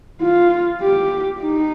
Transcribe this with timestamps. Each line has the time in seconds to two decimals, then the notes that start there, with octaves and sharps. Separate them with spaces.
0.22 F4
0.81 G4
1.41 D#4